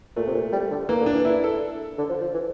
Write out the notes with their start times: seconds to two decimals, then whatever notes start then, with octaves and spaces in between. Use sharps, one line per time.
0.16 A#2 A3
0.28 C3
0.35 A#2
0.52 G3
0.71 D3
0.89 E3 A#3
1.01 D3
1.06 D4
1.13 E3
1.25 E4
1.44 A4
1.98 D3
2.09 F3
2.21 F3
2.33 E3